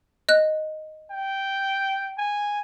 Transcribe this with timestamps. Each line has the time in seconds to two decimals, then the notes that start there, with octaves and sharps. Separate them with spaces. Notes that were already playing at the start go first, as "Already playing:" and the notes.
0.29 D#5 F#6
1.11 G5
2.18 G#5